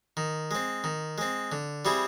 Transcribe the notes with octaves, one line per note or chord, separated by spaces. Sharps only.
D#3
G#3 C4
D#3
G#3 C4
D3
G3 C4 E4 G#4